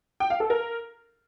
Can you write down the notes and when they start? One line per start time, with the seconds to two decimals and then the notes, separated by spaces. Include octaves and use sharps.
0.20 G5
0.30 F5
0.40 A4
0.50 A#4